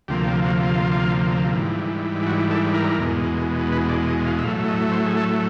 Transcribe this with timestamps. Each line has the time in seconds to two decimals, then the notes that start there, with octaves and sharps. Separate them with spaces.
0.08 D2 C3 F3 A#3 G4
0.27 G4
0.45 F#4
0.63 F4
1.53 G#2 E3 G3
2.26 F#4
2.51 A4
2.74 A#4
2.99 E2 B2 G#3
3.72 B4
3.89 D5
4.08 D#5
4.26 F5
4.39 E5
4.44 A2 F#3 A3 F5
4.68 D#5
4.92 C5
5.06 G#4
5.17 A4